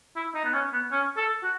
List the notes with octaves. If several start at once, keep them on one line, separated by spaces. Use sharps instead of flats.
E4
D#4
B3
C#4
B3
C#4
A4
F#4